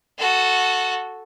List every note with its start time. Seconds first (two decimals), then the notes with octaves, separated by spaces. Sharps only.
0.18 F#4 A4